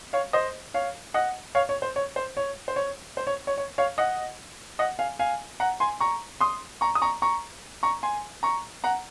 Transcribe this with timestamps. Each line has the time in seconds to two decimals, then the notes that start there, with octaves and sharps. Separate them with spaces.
0.13 C#5 F5
0.33 C5 D#5
0.74 C#5 F5
1.14 D#5 F#5
1.55 C#5 F5
1.69 C#5
1.82 C5
1.96 C#5
2.16 C5
2.37 C#5
2.68 C5
2.76 C#5
3.17 C5
3.27 C#5
3.47 C#5
3.58 C#5
3.78 C#5 F5
3.98 D#5 F#5
4.79 D#5 F#5
4.99 F5 G#5
5.19 F5 G#5
5.60 F#5 A#5
5.80 G#5 C6
6.00 A#5 C#6
6.40 C6 D#6
6.81 A#5 C#6
6.95 D#6
7.02 A#5 C#6
7.22 A#5 C#6
7.83 A#5 C#6
8.03 G#5 C6
8.43 A#5 C#6
8.84 F#5 A#5